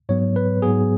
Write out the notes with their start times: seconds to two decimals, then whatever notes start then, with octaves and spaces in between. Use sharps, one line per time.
0.09 G#2 F#3 B3 C#5
0.36 B4
0.62 G#2 F#3 B3 G#4